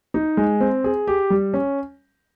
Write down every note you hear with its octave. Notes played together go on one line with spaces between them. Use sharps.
D#4
G#3
C4
G#4
G4
G3
C#4